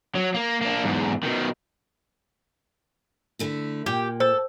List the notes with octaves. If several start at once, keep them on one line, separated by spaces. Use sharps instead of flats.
F#3
A#3
A#3 D4
E2 G#2
B2 D#3
D3 A3 E4
A#2 G4
A4 C5